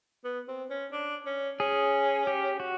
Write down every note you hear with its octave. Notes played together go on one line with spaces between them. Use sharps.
B3
C4
C#4
D4
C#4
C#4 G#4
G4
F#4